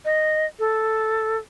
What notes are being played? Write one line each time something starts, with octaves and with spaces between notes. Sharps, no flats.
D#5
A4